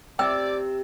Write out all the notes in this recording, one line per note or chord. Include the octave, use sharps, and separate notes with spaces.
C3 D5 G5 E6